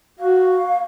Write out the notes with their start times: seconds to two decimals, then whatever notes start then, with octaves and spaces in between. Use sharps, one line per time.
0.19 F#4 F5